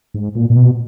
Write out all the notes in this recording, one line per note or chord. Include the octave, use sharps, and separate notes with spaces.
G#2
A#2
A#2
B2